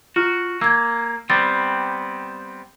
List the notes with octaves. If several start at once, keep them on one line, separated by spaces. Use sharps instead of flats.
F4 F#4 F6
A#3 E6 G#6
G3 B3 C4 A6